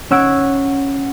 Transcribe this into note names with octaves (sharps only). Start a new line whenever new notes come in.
C#4 F#5 E6 G#6 D7